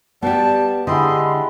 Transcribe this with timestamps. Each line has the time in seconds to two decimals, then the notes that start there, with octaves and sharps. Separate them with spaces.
0.23 G3 B3 G4 A5
0.87 D3 G#3 E4 G4 D#5 C6